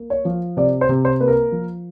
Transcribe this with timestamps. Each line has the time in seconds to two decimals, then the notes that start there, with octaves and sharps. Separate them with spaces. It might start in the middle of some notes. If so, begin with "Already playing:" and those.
Already playing: A#3
0.10 C#5
0.25 F3
0.57 C3 D5
0.81 C5
0.89 C3
1.05 C5
1.20 A#3 B4
1.28 A#4
1.52 F3